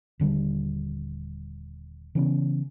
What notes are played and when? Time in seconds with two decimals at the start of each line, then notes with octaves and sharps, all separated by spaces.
0.20 D#1 D3 G3
2.15 C#3 E3 B3 C#4